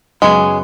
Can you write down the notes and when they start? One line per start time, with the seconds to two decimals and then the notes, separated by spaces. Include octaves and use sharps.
0.22 F#2 C#3 F#3 G#3 B3 G#4